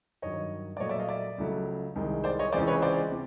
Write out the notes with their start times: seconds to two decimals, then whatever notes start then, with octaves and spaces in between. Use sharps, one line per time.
0.22 G2 D#3 F#3 C#5 D#5
0.77 D5
0.80 A#2 F#3 A3 C#5 D#5
0.89 D5 E5
0.99 D#5 F5
1.09 D5 E5
1.38 C#2 C#3 F#3 A3
1.95 C2 C3 D#3 G#3
2.24 C5 D5
2.39 C#5 D#5
2.52 C#2 C3 E3 G#3 C5 D5
2.67 B4 C#5
2.82 C5 D5
3.11 C3